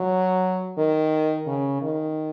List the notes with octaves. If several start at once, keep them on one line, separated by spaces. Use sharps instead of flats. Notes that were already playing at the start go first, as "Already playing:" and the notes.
Already playing: F#3
D#3
C#3
D#3